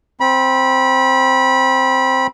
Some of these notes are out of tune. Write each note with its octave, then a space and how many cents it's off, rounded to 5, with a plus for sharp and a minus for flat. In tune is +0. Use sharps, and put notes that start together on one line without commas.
C4 +0 B5 -25